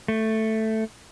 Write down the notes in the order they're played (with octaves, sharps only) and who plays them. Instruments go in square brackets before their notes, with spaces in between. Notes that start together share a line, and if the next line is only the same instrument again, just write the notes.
[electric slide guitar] A3